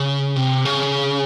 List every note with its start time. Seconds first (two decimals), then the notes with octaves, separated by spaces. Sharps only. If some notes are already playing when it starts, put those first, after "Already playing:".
Already playing: C#3
0.36 C3
0.65 C#3